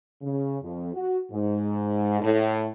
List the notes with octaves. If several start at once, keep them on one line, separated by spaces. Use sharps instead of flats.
C#3
F2
F#4
G#2
A2